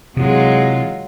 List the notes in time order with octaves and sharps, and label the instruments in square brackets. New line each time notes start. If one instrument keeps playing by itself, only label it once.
[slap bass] C3 E3 [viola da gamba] F#3 G#3 F4